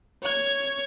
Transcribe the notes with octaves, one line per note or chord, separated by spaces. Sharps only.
C#5 G#6